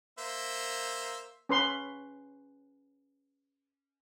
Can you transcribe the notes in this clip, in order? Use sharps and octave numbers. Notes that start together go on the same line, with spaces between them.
A#3 C5 E5
C#4 B4 C6